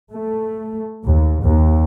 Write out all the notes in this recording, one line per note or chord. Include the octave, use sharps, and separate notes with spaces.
A3
D#2
D#2